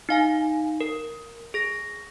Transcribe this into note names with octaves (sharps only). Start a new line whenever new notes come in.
D#4 F5 G#5
A#4
G#4 A#6